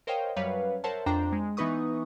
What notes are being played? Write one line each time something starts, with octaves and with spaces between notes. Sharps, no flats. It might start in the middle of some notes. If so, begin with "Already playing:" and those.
A#4 C5 C#5 D#5 F5 G5
F#2 F#3 G3 B4 C#5 F5
A#4 C5 C#5 E5 F#5 A5
F2 D4 C5 G5 A#5
G#3
E3 B3 D#4 B4 C#6 D#6